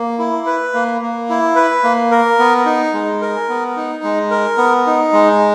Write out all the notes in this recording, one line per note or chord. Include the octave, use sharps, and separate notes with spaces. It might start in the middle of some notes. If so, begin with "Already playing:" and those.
Already playing: A#3
E4
B4
A#3
A#3
E4
B4
A#3
A#4
B3
D#4
G#3
A#4
B3
D#4
G#3
A#4
B3
D#4
G#3